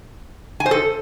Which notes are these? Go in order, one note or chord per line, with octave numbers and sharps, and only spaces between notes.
G#5
C5
A4